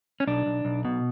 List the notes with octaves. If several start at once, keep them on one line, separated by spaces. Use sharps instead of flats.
C#4
B1 D4
B1
B1
B2